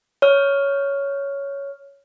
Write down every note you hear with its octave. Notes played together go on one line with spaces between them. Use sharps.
C#5 F6